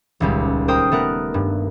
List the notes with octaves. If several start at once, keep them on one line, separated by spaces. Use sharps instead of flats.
D#1 C#2 G3
A#4 C5 G5 D#6
A3 B3 A#4 F#6
G2